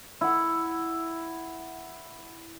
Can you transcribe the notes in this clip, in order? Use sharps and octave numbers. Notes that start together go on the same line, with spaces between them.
E4 F#5